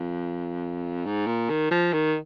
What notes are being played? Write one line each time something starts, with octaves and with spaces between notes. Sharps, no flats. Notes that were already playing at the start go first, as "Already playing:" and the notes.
Already playing: F2
G#2
A#2
D#3
F3
D#3